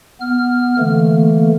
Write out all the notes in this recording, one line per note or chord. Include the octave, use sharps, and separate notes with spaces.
B3 F6
D3 E3 A3 A#3